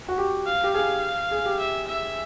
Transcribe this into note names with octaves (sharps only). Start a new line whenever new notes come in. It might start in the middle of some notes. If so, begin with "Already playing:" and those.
F#4
G4
F5
G4
G#4 F5
G#4
G4
E5
E5